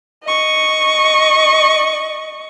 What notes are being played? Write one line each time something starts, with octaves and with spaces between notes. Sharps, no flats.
D#5 C#6